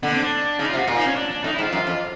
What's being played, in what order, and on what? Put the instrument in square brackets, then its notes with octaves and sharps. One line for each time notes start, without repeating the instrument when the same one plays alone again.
[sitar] D3 [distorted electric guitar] B3
[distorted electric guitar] C4
D4
[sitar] C#3 [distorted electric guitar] D#4
[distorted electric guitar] F4
[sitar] C3
[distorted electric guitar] F#4
[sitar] A#2 [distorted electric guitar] F4
[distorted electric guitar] D#4
C#4
D4
D4
[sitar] A2 [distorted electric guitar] D#4
[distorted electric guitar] E4
[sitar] G#2
[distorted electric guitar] F4
[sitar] F#2
F2